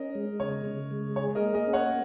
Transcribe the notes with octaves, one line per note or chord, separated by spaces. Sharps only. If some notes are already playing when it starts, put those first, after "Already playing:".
Already playing: C#4 A#4 D#5
G#3
C#3 C#5
C#3
G#3
G#4 C#5
A#4 D#5
A#3
A#4 D#5
C#4
C#5 F#5